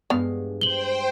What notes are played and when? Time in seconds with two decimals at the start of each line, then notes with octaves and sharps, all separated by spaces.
0.10 G2 G#3 B3 F5
0.61 C5 G5 F#7 G7